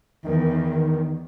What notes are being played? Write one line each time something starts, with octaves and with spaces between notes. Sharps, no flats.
E2 D#3